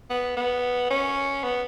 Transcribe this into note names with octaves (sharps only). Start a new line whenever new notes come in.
B3
B3
C#4
B3